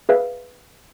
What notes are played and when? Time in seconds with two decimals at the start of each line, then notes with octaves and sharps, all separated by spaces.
0.09 G#4 B4 E5 F5